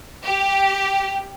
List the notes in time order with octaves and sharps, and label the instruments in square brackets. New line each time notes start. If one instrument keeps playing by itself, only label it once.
[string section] G4